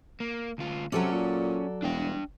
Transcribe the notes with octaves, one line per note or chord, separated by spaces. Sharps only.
A#3
D2 F4
C3 F#3 C#4 A4 D5
A#2
E1 D4 G5